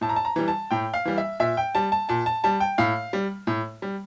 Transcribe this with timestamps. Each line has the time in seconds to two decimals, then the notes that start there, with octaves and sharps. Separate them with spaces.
0.01 A2 A5
0.09 A#5
0.16 A5
0.25 A#5
0.36 E3 G3
0.48 A5
0.71 A2 G5
0.94 F5
1.05 E3 G3
1.18 E5
1.40 A#2 E5
1.57 G5
1.75 G3 A5
1.92 A5
2.09 A#2 A5
2.26 A5
2.44 G3 A5
2.60 G5
2.78 A2 F5
3.13 G3
3.47 A2
3.82 G3